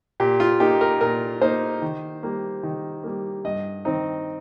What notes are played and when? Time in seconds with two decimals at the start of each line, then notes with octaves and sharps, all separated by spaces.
0.20 A#2 G4
0.40 F4
0.60 A#3 D#4 G4
0.81 A#4
1.01 A#2 A#4
1.41 A#3 D#4 C5
1.82 D#3
2.23 G3 A#3
2.63 D#3
3.04 G3 A#3
3.44 G2 D#5
3.85 D#3 C4 D#4